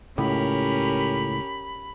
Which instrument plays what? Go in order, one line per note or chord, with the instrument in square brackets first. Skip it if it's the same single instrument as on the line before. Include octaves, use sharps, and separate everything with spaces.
[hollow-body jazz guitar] C#2 [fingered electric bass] A2 [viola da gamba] C#4 G4 A#4 [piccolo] B5